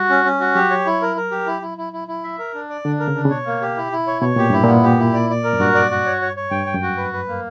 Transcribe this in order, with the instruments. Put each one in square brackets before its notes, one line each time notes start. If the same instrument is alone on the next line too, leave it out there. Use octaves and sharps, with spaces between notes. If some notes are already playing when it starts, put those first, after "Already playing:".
Already playing: [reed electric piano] G3 [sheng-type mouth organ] F#4
[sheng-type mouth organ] C#4
C#4
F#4
[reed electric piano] F#3 [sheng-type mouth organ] G4
[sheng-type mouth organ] C#5
E4
A#4
A#4
G4
E4
E4
E4
E4
E4
E5
A#4
D4
D5
[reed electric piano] D3 [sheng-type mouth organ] D4
[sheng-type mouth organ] A#4
[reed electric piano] C#3
[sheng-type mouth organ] D4
[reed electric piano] C#3
[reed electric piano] B2 [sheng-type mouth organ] C#5
[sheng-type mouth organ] A#3
G4
E4
E4
C#5
[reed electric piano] B2 [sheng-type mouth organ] C#5
[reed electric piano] A#2 [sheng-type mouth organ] G4
[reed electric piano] G2 [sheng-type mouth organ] E4
[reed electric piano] A#2 [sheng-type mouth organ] B3
[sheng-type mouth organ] G4
E4
D5
D5
A#4
[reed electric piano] F#2
[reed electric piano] G2 [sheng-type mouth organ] F#4
[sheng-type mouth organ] D5
F#4
C#5
C#5
C#5
[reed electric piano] G2 [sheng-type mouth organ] G5
[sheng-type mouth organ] G5
[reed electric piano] F#2
[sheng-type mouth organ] F#4
B4
B4
A#3